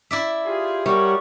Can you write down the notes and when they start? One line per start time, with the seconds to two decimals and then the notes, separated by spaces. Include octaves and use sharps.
0.11 E4 D5 E5
0.45 F4 G4 G#4
0.86 G3 A#4 C#5 F#5 C#6